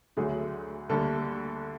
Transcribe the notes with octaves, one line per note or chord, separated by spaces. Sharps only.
D2 D3 F#3 A3 G#4
D2 D3 G3 A#3 A4